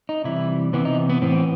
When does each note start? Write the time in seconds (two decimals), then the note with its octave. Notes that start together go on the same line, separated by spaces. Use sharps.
0.09 D#4
0.24 C3 E3 G3 E4
0.73 C3 E3 B3
0.85 D#4
1.10 B3
1.21 A2 E3 B3 C4